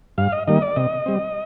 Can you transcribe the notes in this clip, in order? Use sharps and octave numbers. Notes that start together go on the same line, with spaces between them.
G2 F5
D#5
D#3 G3 A#3 D#5
D5
C3 D#5
G3 C4